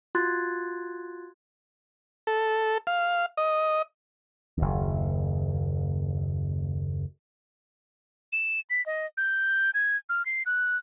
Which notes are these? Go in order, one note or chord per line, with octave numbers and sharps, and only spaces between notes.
F4 F#4 C6 F#6 G#6 A6
A4
F5
D#5
F#1 D#2
E7
B6
D#5
G6
G#6
F6
C7
F#6